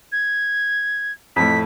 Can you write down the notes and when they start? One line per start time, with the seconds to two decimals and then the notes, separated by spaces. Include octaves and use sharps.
0.12 G#6
1.36 F2 A2 B6